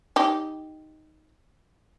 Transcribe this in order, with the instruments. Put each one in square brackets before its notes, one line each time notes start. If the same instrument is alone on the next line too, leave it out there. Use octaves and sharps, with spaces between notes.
[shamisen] D#4 G4